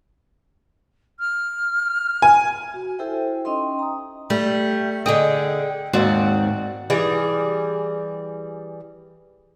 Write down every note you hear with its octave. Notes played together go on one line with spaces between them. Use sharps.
F6
G#5
F#4
E4 G4 A4 C5 E5 G5
C#4 D#4 D#5 G5 C6
A#5 D#6
G3 A3
D3 G#4 D#5 G5
D#2 G#2 C4 F#4 D5
E3 G3 G#4